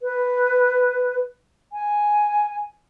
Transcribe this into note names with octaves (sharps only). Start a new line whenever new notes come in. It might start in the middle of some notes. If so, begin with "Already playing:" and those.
B4
G#5